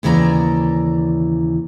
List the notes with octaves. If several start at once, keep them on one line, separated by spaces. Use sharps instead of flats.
D#2 C#3 E3 D5 A#5